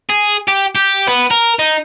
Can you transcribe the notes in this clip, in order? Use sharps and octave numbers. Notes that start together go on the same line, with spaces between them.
G#4
G4
G4
B3
A#4
D#4